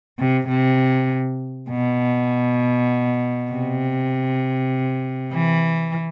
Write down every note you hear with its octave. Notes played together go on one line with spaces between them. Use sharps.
C3
C3
B2
C3
E3